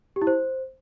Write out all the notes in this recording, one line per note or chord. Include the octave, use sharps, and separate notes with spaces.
G4
E4
C5